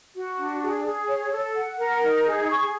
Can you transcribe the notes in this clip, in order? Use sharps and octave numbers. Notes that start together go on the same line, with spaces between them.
F#4
D4
G#4
G#4
C#5
A4
F#5
A#4
D#4
G#4
C#6